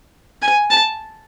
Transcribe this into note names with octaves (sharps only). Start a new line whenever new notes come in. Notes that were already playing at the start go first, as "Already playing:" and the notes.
G#5
A5